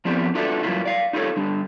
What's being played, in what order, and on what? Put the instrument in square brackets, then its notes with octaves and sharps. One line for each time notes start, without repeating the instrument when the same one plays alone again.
[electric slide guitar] F3 B3 C4 E4 G4 D5
D4 F4 F#4 A4 D5 E5
G2 E3 F#3 A#3 E4 F4
D5 F5
D#4 F4 G4 A4 C#5
D3 G3 D4